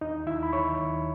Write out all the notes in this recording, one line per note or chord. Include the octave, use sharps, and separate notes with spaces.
D#2 D#4 D#5
D#2 E4 E5
B5
D#3 C#5 C#6
D#2